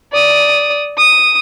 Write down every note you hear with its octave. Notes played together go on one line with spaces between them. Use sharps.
D5 D#6
D#6